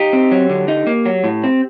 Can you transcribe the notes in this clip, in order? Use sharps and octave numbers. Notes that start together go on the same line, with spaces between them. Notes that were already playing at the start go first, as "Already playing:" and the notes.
Already playing: D#4 G4
C4
F#3
D3
D#4
A#3
F#3
A2
C4